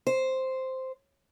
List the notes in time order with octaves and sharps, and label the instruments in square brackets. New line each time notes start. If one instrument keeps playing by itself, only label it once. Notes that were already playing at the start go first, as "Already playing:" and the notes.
[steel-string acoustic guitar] C5